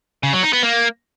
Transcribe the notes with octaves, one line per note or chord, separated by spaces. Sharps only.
C#3
F#3
D#4
B3
A#3